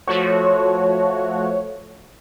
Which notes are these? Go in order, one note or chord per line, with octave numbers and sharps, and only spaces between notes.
F3 A3 F#4 C#5